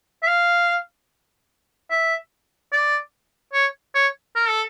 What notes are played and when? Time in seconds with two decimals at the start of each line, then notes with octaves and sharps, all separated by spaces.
0.23 E5
0.28 F5
1.91 E5
2.72 D5
3.53 C#5
3.95 C#5
4.35 A#4
4.49 A4